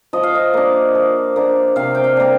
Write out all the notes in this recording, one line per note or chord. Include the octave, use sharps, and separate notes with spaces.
F3 D#5
F5
D#5
A#3 D4
F3
A#3 D4
C3 F5
G5
F5
G3 A#3 D4